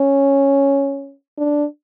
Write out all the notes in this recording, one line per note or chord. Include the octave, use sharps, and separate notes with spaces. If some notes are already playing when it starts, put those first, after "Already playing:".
Already playing: C#4
D4